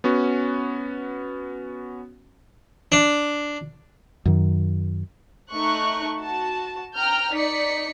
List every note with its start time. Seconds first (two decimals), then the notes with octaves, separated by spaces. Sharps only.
0.04 B3 C#4 F#4
2.92 D4
4.26 F#2 D#3
5.52 A3 D#4 C#6 F#6
6.21 F#4 A5
6.96 G5 A#5 F6 G6
7.34 D#4 D5 B6 C#7